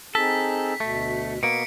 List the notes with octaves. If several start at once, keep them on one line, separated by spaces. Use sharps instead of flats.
C4 D#4 G#4 A4 B6
D2 B2 A3
B2 A#3 C#7 D7